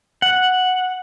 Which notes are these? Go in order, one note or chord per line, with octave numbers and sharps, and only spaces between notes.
F#5